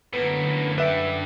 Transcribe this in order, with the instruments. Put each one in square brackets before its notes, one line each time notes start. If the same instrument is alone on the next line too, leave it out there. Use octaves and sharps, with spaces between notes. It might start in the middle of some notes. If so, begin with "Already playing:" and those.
[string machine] F#2 D3 [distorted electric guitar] A2 A#3 [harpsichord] B3
[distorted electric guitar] D4 G5 [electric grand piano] B4 E5 [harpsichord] F#5